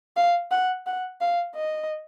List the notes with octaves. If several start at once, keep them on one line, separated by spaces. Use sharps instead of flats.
F5
F#5
F#5
F5
D#5